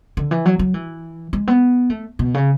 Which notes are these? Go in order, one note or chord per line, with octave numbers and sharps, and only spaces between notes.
D3
E3
F#3
F#3
E3
G#3
B3
A3
B2
C#3